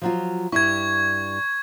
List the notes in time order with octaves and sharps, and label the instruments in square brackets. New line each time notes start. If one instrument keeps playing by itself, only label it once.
[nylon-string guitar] F3 F#3 F4
[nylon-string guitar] G2 G3 E4 [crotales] C#6 G#6